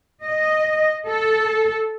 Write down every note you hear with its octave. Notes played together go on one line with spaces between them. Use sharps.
D#5
A4